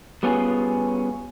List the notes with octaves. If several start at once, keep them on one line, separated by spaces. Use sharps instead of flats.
G3 B3 C#4 F4 G#4